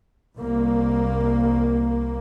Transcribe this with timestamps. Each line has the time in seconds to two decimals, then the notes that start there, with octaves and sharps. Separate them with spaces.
0.36 C2 A#3